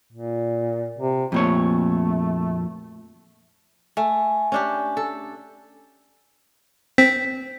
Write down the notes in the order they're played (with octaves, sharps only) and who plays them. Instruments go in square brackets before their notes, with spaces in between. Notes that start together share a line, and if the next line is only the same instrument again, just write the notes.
[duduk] A#2
C3
[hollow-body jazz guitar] F2 A#2 C#5 [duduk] A3
[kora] A3 [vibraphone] G#5
[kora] C#4 D4 G4 [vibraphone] G#5
[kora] A4
[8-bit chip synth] C4 [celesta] B6